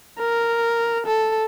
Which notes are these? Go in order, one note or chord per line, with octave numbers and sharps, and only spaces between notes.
A#4
A4